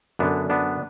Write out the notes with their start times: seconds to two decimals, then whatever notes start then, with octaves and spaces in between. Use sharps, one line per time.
0.19 F#2 D3 B3 D4
0.50 B3 D4